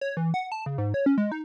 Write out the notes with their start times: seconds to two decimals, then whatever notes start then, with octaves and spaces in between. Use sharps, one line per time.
0.01 C#5
0.17 E3
0.34 F#5
0.52 A5
0.66 C#3
0.78 G#2
0.94 C#5
1.06 C#4
1.18 G#3
1.32 D#4